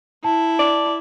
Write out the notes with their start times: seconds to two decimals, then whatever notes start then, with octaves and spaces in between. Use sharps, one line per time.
0.24 E4 A5
0.59 D5